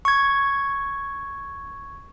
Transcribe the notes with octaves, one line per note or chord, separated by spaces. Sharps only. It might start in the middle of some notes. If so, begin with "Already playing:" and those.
C#6 G#6